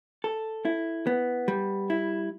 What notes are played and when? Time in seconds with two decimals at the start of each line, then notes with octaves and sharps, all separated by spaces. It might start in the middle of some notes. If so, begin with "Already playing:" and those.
0.24 A4
0.65 E4
1.07 B3
1.48 G3
1.90 E4